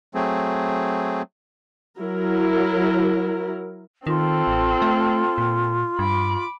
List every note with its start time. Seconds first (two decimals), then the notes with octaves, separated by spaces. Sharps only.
0.15 F#3 A3 C4 G#4
1.97 F#3 E4 A#4
4.07 D#3 C4 F4 A4
4.47 A1
4.82 A3
5.38 A#2
5.99 G2 B5 D6